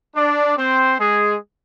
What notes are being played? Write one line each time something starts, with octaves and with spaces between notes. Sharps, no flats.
D4 D5
C4 C5
G#3 G#4